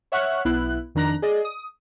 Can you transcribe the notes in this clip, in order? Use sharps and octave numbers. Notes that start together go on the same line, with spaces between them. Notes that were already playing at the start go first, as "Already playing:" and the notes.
C#5 E5 F#5 C#6 F6 F#6
B1 B3 E4 F#6
F2 D#3 D4 A#5 F#6 A#6
G#4 D5 D#5
D#6